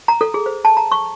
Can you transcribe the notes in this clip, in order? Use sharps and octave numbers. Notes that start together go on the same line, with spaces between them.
A#5
A4
G#4
C5
A5
A#5
C#6